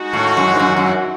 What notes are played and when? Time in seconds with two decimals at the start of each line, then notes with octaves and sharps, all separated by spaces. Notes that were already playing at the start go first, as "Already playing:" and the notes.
Already playing: G#3 D#4 F#4
0.13 A2
0.37 F#2
0.54 G#2
0.59 F#2
0.77 F#2